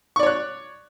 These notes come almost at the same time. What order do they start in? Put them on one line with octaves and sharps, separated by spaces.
C#6 D5 C#5 F#6